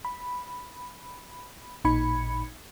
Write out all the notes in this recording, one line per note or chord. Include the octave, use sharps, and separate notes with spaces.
B5
A1 A#2 D#4 B5 G#6 C#7